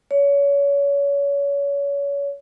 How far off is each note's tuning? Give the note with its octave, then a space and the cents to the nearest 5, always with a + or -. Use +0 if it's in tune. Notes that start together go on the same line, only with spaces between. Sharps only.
C#5 +30